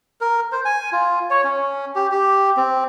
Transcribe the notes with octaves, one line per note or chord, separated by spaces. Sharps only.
A#4
C5
G#5
F4
C#5
C#4
G4
G4
C4